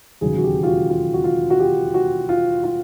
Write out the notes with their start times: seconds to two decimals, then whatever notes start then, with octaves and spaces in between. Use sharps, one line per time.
0.21 E1 D#2 C#3 F#3 G#4
0.38 F#4
0.44 G4
0.63 F4
0.66 F#4
0.90 F4
1.14 F#4
1.24 F4
1.50 F#4
1.60 G4
1.94 F#4
2.29 F4
2.64 F4